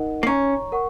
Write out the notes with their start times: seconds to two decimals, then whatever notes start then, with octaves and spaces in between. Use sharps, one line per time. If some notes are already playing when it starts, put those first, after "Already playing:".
Already playing: D#4 A#4 D#5 F#5
0.23 A#3
0.27 C#4 C#5 A#5 C#6
0.72 A#4 F#5 C#6